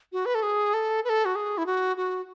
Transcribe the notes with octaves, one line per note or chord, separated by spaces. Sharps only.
F#4
B4
A4
G#4
A4
B4
A4
F#4
G#4
E4
F#4
F#4